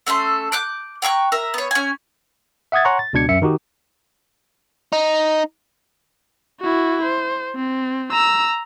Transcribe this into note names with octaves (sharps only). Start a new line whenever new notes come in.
A3 C#4 A4 C6
D6 F#6 G6
G5 A#5 C#6 F#6
A#4 E5 A#5
B3 C#5
C#4 G#5
E5 F#5 D#6 G#6 A6
C#5 F#5 G#5 A#5 C6 C#6
A6
C#2 B2 D4 G#6 C#7
F#2 E5 C#7
D#3 D#4 F#4 G4
D#4
E4 F#4
C5
C4
A#5 E6